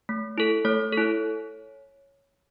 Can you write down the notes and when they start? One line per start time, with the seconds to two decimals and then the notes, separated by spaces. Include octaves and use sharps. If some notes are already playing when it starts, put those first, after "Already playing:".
0.09 A3
0.38 E4 A4
0.65 A3 C#5
0.92 A4
0.98 E4